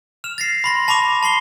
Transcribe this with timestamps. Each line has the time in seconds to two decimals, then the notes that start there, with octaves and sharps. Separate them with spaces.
0.24 F6 E7 F7
0.38 A6 A#6 C7
0.64 B5 C6 A#6
0.88 A5 B5 C#6 D6 F7
1.23 A5 C6 C7 G7